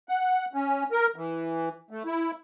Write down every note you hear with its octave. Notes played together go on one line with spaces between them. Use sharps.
F#5
C#4
A#4
E3
A3
E4